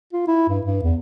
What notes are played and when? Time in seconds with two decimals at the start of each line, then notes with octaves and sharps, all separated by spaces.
0.13 F4
0.28 E4
0.49 G2
0.65 G2
0.83 E2